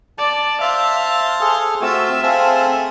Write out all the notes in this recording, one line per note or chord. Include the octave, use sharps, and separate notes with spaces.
D5 A5
C5 E5 F5 A5
G#4 A4
A3 C4 F4 F#4 E5 E6
A3 C4 G#4 C5 F5 A5